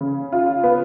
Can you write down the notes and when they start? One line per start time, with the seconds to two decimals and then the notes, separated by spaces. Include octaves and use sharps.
0.01 C#3
0.32 F4
0.64 B3